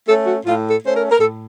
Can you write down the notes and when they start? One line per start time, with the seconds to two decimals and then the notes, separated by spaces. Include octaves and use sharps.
0.08 A3 C#4 A4
0.27 F#4
0.46 A2 F4
0.70 A4
0.83 A3 C#4 C5
0.95 A#4
1.11 A#4
1.19 A2 A4